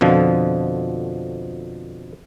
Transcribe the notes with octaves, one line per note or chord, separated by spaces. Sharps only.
F2 B2 D3 F3